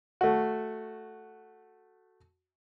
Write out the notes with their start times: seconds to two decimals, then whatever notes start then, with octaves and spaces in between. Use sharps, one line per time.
0.21 A3 F#4